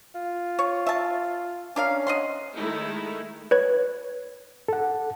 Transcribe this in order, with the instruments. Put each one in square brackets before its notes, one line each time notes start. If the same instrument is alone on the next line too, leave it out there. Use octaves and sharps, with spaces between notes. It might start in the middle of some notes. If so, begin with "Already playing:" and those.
[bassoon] F4
[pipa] C#5
E5 A5
[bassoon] C#4 [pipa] D4 A#4 F5
[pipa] D#5 F#5 C6
[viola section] D#3 G#3 A3 D#4 E4
[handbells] B4 C#5 G#6
[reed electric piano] A4 F#5